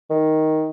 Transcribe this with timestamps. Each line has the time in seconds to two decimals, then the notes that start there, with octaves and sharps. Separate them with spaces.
0.10 D#3